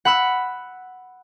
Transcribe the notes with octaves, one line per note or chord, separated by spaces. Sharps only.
F#5 B5 E6